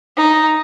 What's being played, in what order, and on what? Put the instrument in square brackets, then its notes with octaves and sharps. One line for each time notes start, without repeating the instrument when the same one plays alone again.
[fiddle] D#4